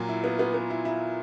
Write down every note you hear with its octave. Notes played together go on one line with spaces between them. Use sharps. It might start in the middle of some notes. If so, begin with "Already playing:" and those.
Already playing: A#2 F#3 F4
E4
B3
B3
B3
E4
E4